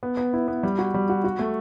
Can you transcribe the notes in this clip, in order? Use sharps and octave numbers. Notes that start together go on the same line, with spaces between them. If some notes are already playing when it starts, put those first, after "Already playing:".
B3
B3
E4
B3
G3
F#4
G3
F#4
F#4
A3